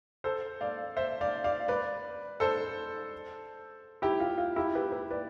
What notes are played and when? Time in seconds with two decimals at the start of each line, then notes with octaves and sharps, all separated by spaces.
0.24 A4 C5
0.61 D5 F5
0.97 C5 E5
1.21 D5 F5
1.44 D5 F5
1.68 B4 D5
2.40 A4 C5
4.02 E4 G4
4.20 F4
4.38 F4
4.56 E4 G4
4.75 G4 B4
4.92 G4 B4
5.11 B4 D5